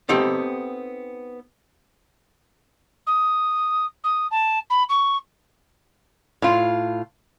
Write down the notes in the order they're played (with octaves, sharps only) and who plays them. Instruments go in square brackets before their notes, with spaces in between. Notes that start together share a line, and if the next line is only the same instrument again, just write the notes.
[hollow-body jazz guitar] B3 C4 D#4 G4 A4
[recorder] D#6
D#6
A5
B5
C#6
[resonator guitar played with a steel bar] A2 F4